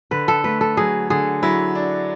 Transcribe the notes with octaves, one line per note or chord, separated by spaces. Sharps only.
D3 B4
A4
A3 B4
A4
F#3 G#4
D3 G#4
F#3 E4
D4